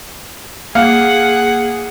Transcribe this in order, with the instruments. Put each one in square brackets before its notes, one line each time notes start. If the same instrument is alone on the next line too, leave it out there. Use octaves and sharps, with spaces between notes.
[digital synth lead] A#3 [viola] G#4 [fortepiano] F5 [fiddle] F#5